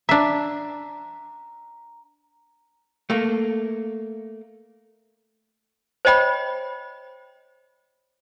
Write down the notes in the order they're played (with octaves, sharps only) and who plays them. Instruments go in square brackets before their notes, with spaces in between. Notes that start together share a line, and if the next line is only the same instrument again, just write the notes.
[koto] D4 E5 [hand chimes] A#5
[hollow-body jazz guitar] A3 A#3
[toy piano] C5 C#5 D#5 G5 B5